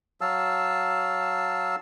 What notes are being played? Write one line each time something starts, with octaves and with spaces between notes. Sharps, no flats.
F#3 F5 A5 E6